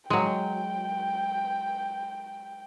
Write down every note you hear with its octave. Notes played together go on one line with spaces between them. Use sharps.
F#3 G#3 G5